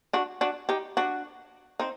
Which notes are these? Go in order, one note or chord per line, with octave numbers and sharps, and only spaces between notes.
D4 F#4
D4 F#4
D#4 G4
D4 F#4
C4 D#4